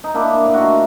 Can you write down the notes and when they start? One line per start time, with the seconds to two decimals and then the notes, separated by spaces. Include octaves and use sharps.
0.04 D#4
0.14 A#3 D4 E4
0.45 A2
0.54 F#4
0.60 D#4 F4